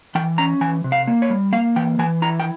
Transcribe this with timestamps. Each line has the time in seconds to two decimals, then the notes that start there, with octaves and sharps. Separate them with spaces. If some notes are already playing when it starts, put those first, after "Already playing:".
0.15 E3 G5
0.38 C#4 A#5
0.61 E3 G#5
0.84 C3
0.92 F5
1.07 A#3
1.22 C#5
1.30 G3
1.53 A#3 F5
1.76 E3 G5
1.99 E3 G#5
2.22 E4 A#5
2.40 G5